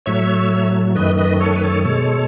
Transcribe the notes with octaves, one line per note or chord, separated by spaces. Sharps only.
A2 F#3 A3 C#5 E5
F#2 D#3 A3 B4 D#5
B4 D#5
A4 C#5
B4
A4 C#5
B2 G#3 A4 C#5